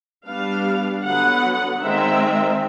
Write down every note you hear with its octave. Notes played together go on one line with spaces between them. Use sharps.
G3 B3 D4 F5
D3 F#3 B3 F#5
D#3 G#3 C4 E5